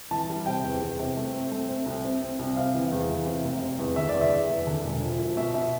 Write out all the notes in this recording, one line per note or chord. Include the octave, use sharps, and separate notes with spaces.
E3 A5
G3
C3 G5
E2
E2
C3
A3
C4
A3
C4
C2
C4
C4
C2
C3 F5
E3
E2
E3
C3
F1
C3
E2
D3 E5
E2 D5
E5
E2
E2
D3
E1
F3
F3
B2 E5
B2 E5